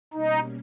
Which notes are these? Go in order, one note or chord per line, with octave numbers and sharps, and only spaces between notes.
B2 G3 A#3 C#4 D#4